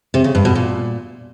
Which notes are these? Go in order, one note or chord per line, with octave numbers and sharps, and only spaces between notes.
C3
C#3
G2
B2
A#2